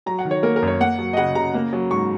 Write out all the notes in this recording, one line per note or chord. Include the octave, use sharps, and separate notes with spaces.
F#3 A#5
F#5
D#3
C#5
A#3 A#4
A#4
F#2
C#5
A#3 F#5
F#3
D#5
C#3 F#5
C#3 A#5
A#3
F#3
G#2 C#6